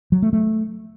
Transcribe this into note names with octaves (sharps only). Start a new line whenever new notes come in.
F#3
A3
A3